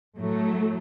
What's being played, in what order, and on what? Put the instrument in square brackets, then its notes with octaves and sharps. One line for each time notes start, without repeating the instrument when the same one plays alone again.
[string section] A2 F#3 A3